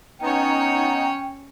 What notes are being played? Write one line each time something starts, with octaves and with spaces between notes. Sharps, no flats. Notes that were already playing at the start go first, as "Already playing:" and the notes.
B3 C#4 D#4 C#5 G5